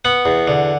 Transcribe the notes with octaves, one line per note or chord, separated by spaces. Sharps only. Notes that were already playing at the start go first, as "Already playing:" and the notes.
B3 F#5
E2
D3